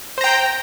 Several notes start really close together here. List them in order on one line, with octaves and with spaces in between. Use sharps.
C5 A#5 G5